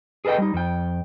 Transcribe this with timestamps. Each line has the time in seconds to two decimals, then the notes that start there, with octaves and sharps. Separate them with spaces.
0.25 G#4 A4 B4 D#5 G5
0.38 G3 D#4
0.54 F2 G5